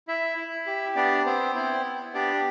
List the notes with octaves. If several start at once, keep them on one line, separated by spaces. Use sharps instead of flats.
E4 E5
E4
G4
B3 D4 D5
B3 C4 C5
C4 E4 C5
B3
D4 G4 D5